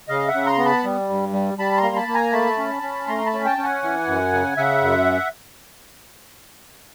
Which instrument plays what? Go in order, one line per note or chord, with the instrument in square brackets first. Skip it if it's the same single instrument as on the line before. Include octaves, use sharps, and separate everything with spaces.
[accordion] C#3 D#5 F5
E5 F#5
C#3
A#5 C6
B3
A5 B5
G3
G2
G3
G3 A5 B5
A#5 C6
A#3
A5 B5
A#3
G#5 A#5
A3 A5 B5
C#4
C#4
A3 A#5 C6
A5 B5
C#4
G5 A5
C#4
F#5 G#5
E3
F#2
C#3
C#3 E5 F#5
F#2